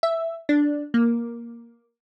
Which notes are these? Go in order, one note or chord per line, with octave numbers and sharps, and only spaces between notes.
E5
D4
A#3